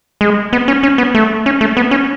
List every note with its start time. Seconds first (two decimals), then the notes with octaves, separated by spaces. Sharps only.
0.21 G#3
0.53 B3
0.68 C#4
0.83 C#4
0.98 B3
1.15 A3
1.46 C#4
1.61 A3
1.77 B3
1.91 C#4